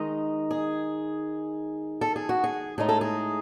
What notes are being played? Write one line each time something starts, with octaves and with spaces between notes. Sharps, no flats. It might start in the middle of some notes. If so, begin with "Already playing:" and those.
Already playing: D#3 G#3 D#4 D#5
G#4
A4
G#4
F#4
G#4
A2 G#3 D#4 G#4
A4
G#4